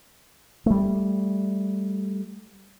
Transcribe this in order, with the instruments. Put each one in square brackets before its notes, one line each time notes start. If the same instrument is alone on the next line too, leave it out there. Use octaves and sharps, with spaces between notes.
[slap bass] G3 A3